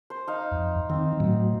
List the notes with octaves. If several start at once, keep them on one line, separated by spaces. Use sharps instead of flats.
C5
D#4 F5
F2
D#3 C4
A2 F#3